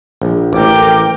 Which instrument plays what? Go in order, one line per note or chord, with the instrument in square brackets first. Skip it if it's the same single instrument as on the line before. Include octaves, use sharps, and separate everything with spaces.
[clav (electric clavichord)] A#1
[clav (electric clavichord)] A1 [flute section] A#4 G5 D6